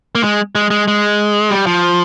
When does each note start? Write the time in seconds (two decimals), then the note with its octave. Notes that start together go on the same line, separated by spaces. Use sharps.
0.15 A#3
0.23 G#3
0.55 G#3
0.71 G#3
0.88 G#3
1.51 G3
1.66 F3